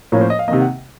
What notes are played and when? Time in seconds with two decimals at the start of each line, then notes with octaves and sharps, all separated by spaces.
0.12 A2 F3 A#3 C#4 A#4
0.21 C5
0.30 D#5
0.39 F5
0.48 A#3 D#5
0.50 C3 D#3
0.60 F#5